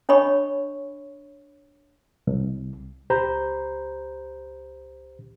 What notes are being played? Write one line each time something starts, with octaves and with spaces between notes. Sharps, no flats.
D4 C#5 D#5 B5 C#6
C2
C#2 G4 C5 A#5 B5 G6